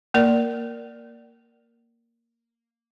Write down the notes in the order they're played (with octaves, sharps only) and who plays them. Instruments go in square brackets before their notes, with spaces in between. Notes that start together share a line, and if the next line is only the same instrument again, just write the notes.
[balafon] A#3 A#4 D5